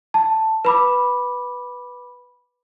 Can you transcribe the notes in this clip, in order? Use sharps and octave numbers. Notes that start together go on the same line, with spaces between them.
A5
B4 B5 D6